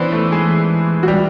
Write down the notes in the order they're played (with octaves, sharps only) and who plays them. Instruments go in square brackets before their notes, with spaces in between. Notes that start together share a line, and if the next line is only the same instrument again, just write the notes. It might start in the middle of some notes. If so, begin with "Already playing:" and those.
Already playing: [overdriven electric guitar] E3 [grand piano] B3 C#4 D4 B4 C5 D5
[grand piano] A3 A4
G#3 G#4
F#4
G3 G4